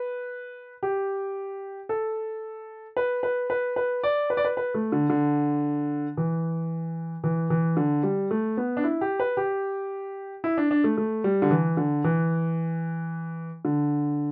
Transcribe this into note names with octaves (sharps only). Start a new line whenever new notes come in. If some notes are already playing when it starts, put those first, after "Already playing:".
Already playing: B4
G4
A4
B4
B4
B4
B4
D5
B4
D5
B4
B4
A3
D3
D3
E3
E3
E3
D3
G3
A3
B3
D4
E4
G4
B4
G4
E4
D4
D4
A3
A3
G3
D3
E3
D3
E3
D3